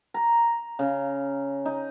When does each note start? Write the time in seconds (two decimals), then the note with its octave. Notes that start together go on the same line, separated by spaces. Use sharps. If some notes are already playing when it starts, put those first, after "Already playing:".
0.14 A#5
0.79 C#3
1.65 D#4